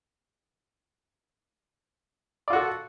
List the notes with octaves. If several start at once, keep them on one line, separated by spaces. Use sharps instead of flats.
F4 F#4 A4 D5